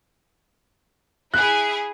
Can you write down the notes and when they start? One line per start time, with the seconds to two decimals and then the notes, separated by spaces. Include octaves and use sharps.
1.34 E4 G#4 F#6